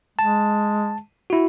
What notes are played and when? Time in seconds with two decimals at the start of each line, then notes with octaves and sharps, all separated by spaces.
0.19 G#3 A5
1.30 E4 F#4